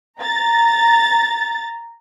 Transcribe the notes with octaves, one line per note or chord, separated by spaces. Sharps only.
A#5 A6